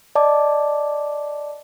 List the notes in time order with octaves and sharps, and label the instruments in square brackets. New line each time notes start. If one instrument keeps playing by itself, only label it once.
[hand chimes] D5 D#5 A5 D6